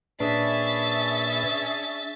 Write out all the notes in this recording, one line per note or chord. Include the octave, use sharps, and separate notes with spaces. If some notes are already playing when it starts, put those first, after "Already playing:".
A#2 C#4 D4 G#4 B4 E5 A6